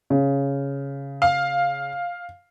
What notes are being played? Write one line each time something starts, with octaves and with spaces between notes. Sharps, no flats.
C#3
F5